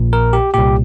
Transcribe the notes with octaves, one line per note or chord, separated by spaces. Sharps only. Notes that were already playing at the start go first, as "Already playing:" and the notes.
Already playing: A#1 A#2
A#4
G4
C2 A#2 G4